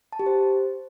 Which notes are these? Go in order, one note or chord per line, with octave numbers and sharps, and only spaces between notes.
A5
G4
C5